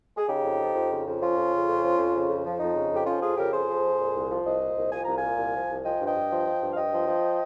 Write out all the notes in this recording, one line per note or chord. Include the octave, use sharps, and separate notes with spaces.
G#4
C#3 D#4 G4
F2
F3
F2
C#3
F2
F3 C#4 F4
F2
C#3
F2
F3
F2
C#3
F2
F3
F2 D#4
C#3
F2 G4
F3 C#4 F4
F2 F4 G#4
C#3 G4 A#4
F2 G#4 C5
F3
F2
A#2
C2
F3
C2 C5 D#5
A#2
C2
F3 G#5
C2 A#5
A#2 F5 G#5
C2
F3
C2
F3 D#5 G5
G2
D#5 G5
G2
F3
F3
G2
F5
G2 D#5 G5
F3
F3